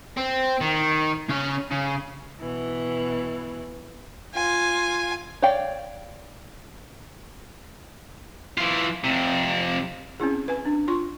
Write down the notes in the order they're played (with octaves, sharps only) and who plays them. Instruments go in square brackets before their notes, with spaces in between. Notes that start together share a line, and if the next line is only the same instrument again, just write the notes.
[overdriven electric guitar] C4
D#3
C#3 C#4
C#3
[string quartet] B2 E3
[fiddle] F4 G#5
[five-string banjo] C#5 D5 F5 G5
[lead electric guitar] E3 F4
F2 C3
[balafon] C4 C#4 E4 G#4
B4 G#5
D4
F4 C6 C#6